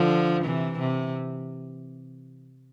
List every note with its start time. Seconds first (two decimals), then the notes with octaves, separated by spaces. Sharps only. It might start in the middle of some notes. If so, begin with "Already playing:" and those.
Already playing: D3 F3
0.44 C3 E3
0.79 C3